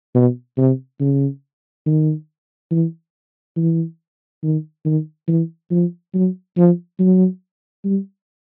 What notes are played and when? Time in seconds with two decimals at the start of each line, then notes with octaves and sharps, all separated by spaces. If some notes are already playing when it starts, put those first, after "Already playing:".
0.15 B2
0.57 C3
1.00 C#3
1.86 D#3
2.71 E3
3.56 E3
4.43 D#3
4.85 D#3
5.28 E3
5.71 F3
6.14 F#3
6.57 F3
6.99 F#3
7.84 G3